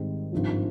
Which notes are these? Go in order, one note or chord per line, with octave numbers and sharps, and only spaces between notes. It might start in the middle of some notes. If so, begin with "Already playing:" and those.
Already playing: G#1 G#2 D#3 G3 C4
G#1 G2 F3